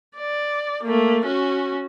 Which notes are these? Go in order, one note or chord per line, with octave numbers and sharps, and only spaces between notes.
D5
A3 A#3
C#4 F#4